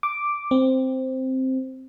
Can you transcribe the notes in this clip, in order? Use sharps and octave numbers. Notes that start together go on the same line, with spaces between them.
D6
C4